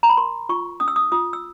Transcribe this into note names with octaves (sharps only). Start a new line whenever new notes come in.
A#5
B5
A#4 C6
F4 C#6
C#4 D#6
E6
D#6
F4 D#6
E6